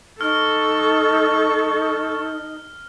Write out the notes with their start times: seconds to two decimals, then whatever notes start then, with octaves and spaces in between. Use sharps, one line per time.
0.21 D#4 A4 C#6 F6